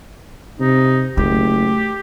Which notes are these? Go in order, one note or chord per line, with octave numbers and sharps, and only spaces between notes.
C3 D#4
F#1 A3 G4